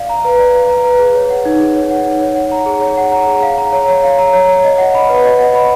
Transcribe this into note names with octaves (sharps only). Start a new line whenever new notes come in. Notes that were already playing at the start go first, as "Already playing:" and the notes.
Already playing: D5 F5
A#5
B4
D5
F5
A#5
B4
G#4
C#5
F#5
D#4
G#4
C#5
F#5
D#4
C#5
F#5
A#5
G#4
C#5
F#5
A#5
G#4
F5
A#5
C#5
C#5
F5
A#5
C#5
C#5
D#5
F#5
B5
B4
D#5
F#5
B5